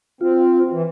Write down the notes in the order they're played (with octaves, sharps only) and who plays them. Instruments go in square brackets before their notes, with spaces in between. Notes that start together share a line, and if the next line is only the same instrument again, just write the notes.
[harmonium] C4 [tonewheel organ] F4
[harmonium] E3